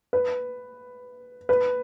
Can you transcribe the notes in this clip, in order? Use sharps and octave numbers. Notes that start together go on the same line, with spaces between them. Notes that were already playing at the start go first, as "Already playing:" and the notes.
B4
B4